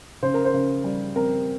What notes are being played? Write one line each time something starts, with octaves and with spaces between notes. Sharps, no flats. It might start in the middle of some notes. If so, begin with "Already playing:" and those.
C#3 C5
A#4
C5
C#3
G3
C4 A#4